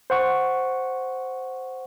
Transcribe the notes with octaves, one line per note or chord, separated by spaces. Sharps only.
C5 F#5 C#6